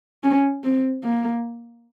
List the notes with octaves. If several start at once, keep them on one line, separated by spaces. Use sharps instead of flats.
C#4
C4
A#3